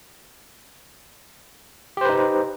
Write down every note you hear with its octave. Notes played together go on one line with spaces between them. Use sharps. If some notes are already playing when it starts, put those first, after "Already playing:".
D#4 G4 B4 C5